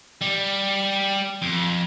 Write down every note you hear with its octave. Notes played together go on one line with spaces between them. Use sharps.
G3
F2